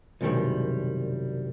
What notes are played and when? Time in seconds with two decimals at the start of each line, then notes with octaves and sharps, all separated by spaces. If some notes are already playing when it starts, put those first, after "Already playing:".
0.21 C2 F#2 B2 D#3 G3 G#3